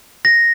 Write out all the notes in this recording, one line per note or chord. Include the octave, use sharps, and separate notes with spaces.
A#6